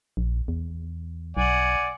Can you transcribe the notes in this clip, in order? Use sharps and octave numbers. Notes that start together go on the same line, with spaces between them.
A#1
E2
B1 D5 F#5 G#5